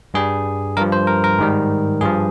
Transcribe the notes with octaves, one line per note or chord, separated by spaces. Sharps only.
G2 G3 G#4
G2 F3 A#4
C5
A#4
A#4
G#2 D#3 G3
G2 F3 G#4